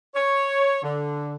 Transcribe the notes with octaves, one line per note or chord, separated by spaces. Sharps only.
C#5
D3